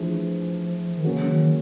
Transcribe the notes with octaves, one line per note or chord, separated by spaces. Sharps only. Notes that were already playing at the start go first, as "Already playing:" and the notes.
Already playing: E3 F3 A3 D4 F4 G#4
D#3
C#3 E3 F#3 A#3 C#4
D#3